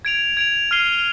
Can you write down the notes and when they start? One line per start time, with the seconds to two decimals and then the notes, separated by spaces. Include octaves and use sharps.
0.05 G#6 D7 F7
0.37 G#6 D7 F7
0.71 F6 C7 D#7 G7